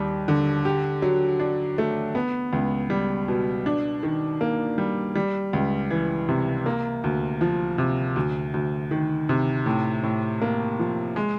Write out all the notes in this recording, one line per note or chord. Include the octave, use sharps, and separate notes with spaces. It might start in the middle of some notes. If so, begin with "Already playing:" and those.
Already playing: D#2 G3
D3
G4
F#3
D4
A3
B3
C#2
G3
B2
D4
D#3
A#3
G3
G3
C#2
E3
C3
A#3
D2
F3
C3
D2
D2
D#3
C3
A2
A2
A#3
F3
G#3